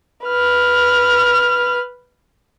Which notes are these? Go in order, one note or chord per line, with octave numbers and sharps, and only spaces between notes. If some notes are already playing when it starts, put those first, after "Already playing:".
B4 F6